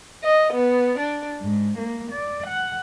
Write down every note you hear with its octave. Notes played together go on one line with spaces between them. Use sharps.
D#5
B3
D4
G#2
A#3
D5
F#5